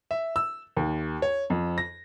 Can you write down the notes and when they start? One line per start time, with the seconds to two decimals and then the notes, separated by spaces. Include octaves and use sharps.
0.11 E5
0.36 E6
0.77 D#2
1.22 C#5
1.50 F2
1.78 A#6